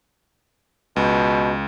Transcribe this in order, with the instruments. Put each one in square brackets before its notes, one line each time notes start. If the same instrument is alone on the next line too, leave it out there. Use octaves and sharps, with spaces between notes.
[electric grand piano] C#2 [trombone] B2